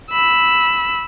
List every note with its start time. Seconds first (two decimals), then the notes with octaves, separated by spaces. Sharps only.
0.11 B5 E6